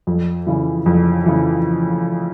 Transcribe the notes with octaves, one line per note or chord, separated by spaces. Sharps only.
F2
C#3 E3
F2
C#3 E3